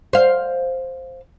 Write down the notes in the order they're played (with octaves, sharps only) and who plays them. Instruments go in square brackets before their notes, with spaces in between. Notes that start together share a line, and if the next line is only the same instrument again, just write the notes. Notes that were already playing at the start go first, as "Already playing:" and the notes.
[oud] C5 F5